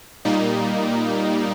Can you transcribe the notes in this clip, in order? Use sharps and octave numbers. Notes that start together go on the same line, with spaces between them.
A#2 G3 A#3 D#4